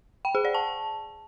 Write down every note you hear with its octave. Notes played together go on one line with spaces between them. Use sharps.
G5
G#4
D5
A5